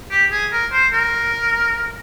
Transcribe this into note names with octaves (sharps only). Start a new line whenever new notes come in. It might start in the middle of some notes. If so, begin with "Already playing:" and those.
G4
G#4
A#4
C5
A#4